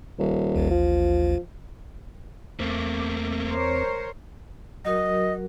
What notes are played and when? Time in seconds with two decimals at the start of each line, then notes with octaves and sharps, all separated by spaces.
0.19 D#1
0.56 A1 D#2
0.71 F3
2.60 E2 A3 A#3 C4 D6
3.47 A#4 C5 C#5
4.85 F#3 F#4 A#4 D#5